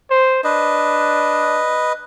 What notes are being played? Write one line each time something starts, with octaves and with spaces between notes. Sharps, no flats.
C5
D4 B4 D#5